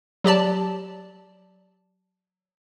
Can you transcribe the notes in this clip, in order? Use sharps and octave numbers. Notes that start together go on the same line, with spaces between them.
F#3 G4 D5 A5